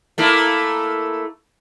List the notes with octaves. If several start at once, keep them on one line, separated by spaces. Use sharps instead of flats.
A3 A#3 E4